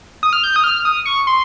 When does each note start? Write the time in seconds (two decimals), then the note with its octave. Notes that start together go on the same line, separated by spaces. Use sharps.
0.23 D#6
0.33 F6
0.44 G6
0.56 D#6
0.64 F6
0.85 D#6
1.06 C#6
1.27 C6